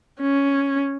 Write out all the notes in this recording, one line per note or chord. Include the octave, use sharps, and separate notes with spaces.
C#4